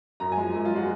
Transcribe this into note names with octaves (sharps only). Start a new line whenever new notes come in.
F#2 A#5
G#5
F3 G#3
F#2
F4
F3 G#3 F#4